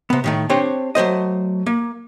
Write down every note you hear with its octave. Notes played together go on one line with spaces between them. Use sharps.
C3 B3
A2 D#3 A3
C4 D4 G4 C5 C#5
F#3 A3 C5 D#5
A#3